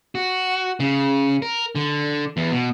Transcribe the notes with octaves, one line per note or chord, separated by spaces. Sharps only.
F#4
C#3
A#4
D3
E2
B2